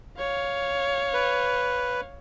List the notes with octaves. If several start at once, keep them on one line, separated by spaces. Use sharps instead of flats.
C#5 F5
B4